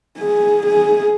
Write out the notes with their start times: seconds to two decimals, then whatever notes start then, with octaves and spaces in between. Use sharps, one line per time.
0.19 G#4
0.66 G#4